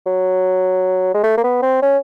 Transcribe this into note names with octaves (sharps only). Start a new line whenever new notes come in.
F#3
G#3
A3
A#3
B3
C4
C#4